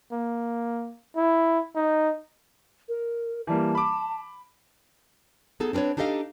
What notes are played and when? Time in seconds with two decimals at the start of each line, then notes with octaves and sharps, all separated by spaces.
0.12 A#3
1.16 E4
1.75 D#4
2.89 A#4
3.47 E3 G3 A#3 A5
3.75 B5 D6
5.60 B3 D#4 G#4 A4
5.73 C4 D4 A#4 B4 C#5
5.97 D4 D#4 G4 A4 D#5 F5